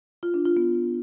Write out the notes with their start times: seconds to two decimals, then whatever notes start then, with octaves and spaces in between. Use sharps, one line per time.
0.23 F4
0.34 D4
0.45 F4
0.57 B3